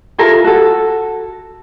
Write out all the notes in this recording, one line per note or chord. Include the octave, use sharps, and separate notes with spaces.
E4 F4 A4 A#4
F#4 A4